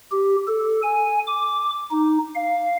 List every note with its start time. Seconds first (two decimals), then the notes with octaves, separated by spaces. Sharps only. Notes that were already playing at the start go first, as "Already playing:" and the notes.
0.11 G4
0.47 A4
0.82 G#5
1.27 D6
1.91 D#4
2.35 F5